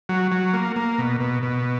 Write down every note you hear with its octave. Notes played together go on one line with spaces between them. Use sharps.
F#3
F#3
A#3
A#3
B2
B2
B2